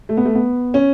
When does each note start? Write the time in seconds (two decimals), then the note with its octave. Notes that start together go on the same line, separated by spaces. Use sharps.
0.09 A3
0.17 B3
0.25 A3
0.35 B3
0.74 C#4